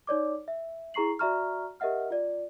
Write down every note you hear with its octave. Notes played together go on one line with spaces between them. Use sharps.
D#4 C#5 D5 D6
E5
E4 G#4 A#5 C#6 C7 F#7
F#4 D5 E5 A#5 C#6 F6
G4 A#4 D#5 E5 F#5 F6
F4 D5